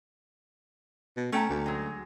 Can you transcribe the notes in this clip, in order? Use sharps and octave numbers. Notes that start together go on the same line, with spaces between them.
B2
A3 C#4 G5 A#5
D2
F#3 G#3